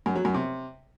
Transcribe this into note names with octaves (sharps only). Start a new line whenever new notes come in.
F#2
F#3
F#2
C3